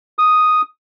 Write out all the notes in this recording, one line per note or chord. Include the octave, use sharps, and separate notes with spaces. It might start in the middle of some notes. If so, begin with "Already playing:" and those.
D#6